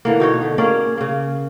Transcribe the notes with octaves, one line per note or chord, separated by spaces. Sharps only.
D3 E3 A#3
B2 D#4 C#5
D3
A#3 C#4 G#4 D5
C#3 A#3